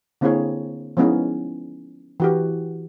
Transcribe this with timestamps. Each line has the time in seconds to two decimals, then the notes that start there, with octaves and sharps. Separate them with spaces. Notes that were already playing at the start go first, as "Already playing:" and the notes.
0.21 D3 A#3 C4 E4 G#4 C#5
0.97 F3 G#3 B3 C#4 D#4 E4
2.20 E3 F#4 G4